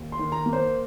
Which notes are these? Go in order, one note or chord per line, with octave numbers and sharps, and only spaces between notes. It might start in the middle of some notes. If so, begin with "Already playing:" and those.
Already playing: D#2
C6
D#3
A#5
A#3
C5